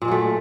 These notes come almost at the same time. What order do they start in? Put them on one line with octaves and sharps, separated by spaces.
A#2 G#3 F#3 A3